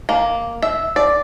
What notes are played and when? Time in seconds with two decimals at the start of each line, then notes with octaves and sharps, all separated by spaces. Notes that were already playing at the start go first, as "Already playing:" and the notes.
0.09 A#3
0.62 E5
0.96 D5